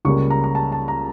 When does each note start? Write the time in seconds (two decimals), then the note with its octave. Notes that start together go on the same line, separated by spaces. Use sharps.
0.05 C#2 C#3 G3 A#3 C#6
0.30 A#5
0.44 A#5
0.55 A5
0.72 A5
0.88 A#5